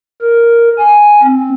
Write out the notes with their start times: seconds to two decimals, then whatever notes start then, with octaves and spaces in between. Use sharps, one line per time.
0.22 A#4
0.78 G#5
1.23 C4